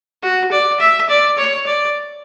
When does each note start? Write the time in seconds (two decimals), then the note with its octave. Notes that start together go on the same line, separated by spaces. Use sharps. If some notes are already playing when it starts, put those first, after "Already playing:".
0.23 F#4
0.51 D5
0.80 E5
1.09 D5
1.38 C#5
1.66 D5